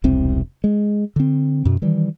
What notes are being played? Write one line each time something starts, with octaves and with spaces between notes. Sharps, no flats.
E1 C2 C3 C4
G#3
D3 C4
F#2 B2
D#3 E3 G3